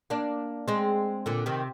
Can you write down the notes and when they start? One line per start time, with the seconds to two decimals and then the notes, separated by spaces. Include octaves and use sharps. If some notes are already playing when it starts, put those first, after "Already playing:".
0.10 A#3 D4
0.68 G#3 C4
1.26 A#2 D3
1.46 C3 D#3